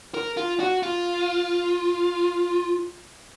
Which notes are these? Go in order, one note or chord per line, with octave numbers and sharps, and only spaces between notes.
A#4
F4
F#4
F4